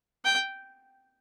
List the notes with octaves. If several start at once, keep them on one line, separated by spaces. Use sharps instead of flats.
G5